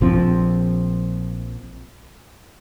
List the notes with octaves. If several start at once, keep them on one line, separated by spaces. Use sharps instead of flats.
A#1 F3 C4